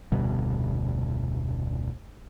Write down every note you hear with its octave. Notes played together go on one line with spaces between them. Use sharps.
F1 D2 B2 G3